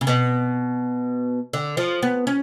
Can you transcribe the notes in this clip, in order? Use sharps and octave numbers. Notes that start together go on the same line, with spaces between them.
C#3
B2
D3
F3
B3
C#4